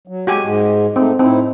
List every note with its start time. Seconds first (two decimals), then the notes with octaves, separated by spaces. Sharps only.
0.07 F#3
0.27 G#3 F#4 G4 G#5
0.43 G#2 G#3
0.96 A3 C4 D#4
1.19 A2 C4 D#4 E4